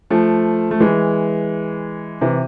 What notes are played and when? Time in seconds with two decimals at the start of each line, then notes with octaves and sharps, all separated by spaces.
0.10 F3 A3
0.71 A3
0.80 E3 G#3
2.21 C3 E3